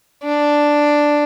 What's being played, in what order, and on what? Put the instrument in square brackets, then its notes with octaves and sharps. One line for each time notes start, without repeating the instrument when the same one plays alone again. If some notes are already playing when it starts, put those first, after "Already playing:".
[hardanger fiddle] D4